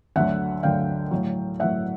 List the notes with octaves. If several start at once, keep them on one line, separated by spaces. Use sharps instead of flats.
D2 D3 F#3 E5 F#5
D2 D3 F#3 F5 G5
A2 F#3
A2 F#3 E5 F#5